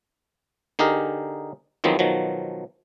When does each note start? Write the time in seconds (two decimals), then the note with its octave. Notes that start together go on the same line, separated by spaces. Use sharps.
0.79 D3 D#4 G4 G#4 A#4
1.84 E2 D#3 F3 F#3 B3 C4
1.99 B2 D#3 F3 F#3